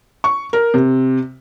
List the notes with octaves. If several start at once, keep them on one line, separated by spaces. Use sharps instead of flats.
C#6
A#4
C3